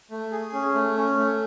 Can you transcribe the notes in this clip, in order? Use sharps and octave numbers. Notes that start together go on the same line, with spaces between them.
A3
G#4
C#4
A3
C#4
A3